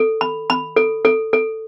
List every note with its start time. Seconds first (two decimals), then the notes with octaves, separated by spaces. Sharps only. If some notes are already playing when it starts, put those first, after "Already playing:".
Already playing: A4
0.21 B5
0.50 B5
0.76 A4
1.05 A4
1.33 A4